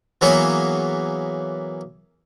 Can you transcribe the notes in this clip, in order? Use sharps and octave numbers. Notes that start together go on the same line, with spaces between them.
E3 F#3 A#3 B3 G#4 C#5